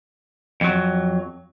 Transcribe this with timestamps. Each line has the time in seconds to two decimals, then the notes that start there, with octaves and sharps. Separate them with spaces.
0.61 F2 F#3